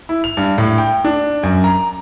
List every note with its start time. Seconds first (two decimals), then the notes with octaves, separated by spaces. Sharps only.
0.09 E4
0.24 F7
0.37 G2
0.58 A2
0.78 G5
1.04 D4
1.43 F#2
1.64 A#5